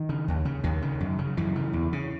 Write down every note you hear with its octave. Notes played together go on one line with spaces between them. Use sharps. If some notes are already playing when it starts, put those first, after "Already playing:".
Already playing: D#3
C#3
D#2
C#3
D#2 D#3
C#3
F#2
C#3
F#2 E3
C#3
E2
C#3